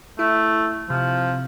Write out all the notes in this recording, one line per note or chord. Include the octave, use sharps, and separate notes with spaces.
A3 E4
C3 F3